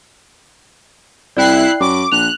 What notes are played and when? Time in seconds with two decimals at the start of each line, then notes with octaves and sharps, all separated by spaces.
1.37 C2 E4 D5 G5 F#6 C7
1.80 F#2 D6
2.12 A#1 F#6 F7